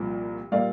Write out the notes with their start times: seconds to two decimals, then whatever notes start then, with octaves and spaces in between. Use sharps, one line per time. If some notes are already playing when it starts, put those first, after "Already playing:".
Already playing: C2 A#2 F3
0.52 A#2 G3 A#3 D5 F5